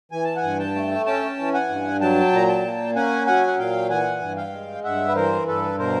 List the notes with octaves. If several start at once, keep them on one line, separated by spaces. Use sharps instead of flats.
E3 G#5
A5
F#5 G#5
G2
G5 A5
A3
C#4 G5 A5
E3
F#5 G#5
G2
F#3 G5 A5
A#2 A#5
G5 A5
A#3
C#4 F#5 G#5
F#3 F#5 G#5
F#5
A#2 F5 G5
E3 F#5 G#5
G2
F5 G5
G#3
G2 E5 F#5
B4
E3 A#4 C5
G2 A4 B4
B2 A#4 C5